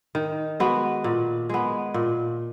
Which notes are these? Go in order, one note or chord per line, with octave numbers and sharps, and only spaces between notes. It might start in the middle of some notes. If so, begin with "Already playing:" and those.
D#3
G#3 B3 F#4
A#2
G#3 B3
A#2